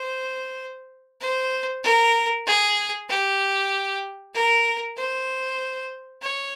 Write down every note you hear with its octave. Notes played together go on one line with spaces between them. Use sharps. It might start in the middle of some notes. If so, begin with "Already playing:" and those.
Already playing: C5
C5
A#4
G#4
G4
A#4
C5
C#5